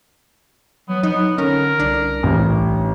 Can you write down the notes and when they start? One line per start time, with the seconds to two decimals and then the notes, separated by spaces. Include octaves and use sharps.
0.89 F#3 B3
1.03 F#3 B3 D#4
1.38 D3 C#4 A#4
1.80 C2 D4
2.23 A1